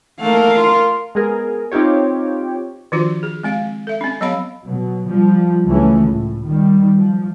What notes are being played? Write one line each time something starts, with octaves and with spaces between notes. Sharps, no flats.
A3 A#3 A#4 F5
F4
G#3 B3 G#4 A#4
C4 D#4 F4 G4 C#5
D#3 F3 D4 F4 F#4 C5
G#4
G#3 C4 F5
A4 E5
C4 C#4
F#3 B3 C#5 D#5 F5 B5
B2 F#3
F3 G3
C#2 E3 G#3 A3 C#4
A2
D#3 G3
F3